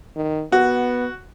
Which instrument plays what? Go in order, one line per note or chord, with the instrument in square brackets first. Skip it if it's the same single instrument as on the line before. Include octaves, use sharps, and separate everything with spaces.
[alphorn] D#3
[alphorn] B3 [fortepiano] F#4